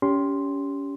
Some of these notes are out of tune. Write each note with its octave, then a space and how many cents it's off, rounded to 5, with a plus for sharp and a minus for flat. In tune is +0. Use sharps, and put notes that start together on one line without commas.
C#4 +30 G4 +0 C6 +0